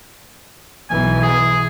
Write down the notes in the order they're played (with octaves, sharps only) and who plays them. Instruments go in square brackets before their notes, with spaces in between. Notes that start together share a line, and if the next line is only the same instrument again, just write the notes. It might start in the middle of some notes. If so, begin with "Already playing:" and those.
[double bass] B1 E3 [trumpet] G#5
[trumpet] G#4